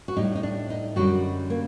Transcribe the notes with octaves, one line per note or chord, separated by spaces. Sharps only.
F#4
A2 G3 D#4
D#4
D4
D#4
F#2 D3 G3 F#4
A#3